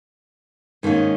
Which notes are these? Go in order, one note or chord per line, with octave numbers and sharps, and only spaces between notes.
G#2 D#3 A#3 C#4